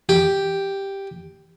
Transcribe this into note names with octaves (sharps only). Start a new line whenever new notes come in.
G4